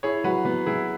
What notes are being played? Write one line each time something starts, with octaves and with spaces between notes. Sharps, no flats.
E4 G#4 C#5
F#3 F#4 B4
F#3 B3
F#3 E4 G#4